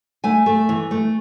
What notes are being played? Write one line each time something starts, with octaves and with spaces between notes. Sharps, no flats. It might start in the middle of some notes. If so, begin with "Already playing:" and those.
A3 G#5
A3
E3
A3